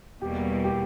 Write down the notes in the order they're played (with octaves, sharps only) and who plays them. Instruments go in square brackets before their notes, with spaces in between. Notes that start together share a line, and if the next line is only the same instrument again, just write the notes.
[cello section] E2 B2 G3 A#3 [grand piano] G4
[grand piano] G4